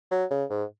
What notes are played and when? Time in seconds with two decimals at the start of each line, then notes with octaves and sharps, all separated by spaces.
0.11 F#3
0.30 C#3
0.50 G#2